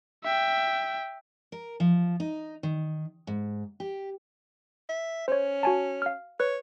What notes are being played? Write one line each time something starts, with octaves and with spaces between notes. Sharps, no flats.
E5 G5
A#4
F3
D#4
D#3
G#2
G4
E5
C#4 C5 C#5
F#4 G#5 A5
F5 F6
B4 C#5